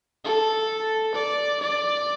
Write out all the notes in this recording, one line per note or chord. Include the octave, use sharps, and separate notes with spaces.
A4
D5
D5